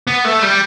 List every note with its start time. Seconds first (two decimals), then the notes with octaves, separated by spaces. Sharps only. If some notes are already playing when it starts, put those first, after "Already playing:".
0.07 B3
0.25 A3
0.42 G3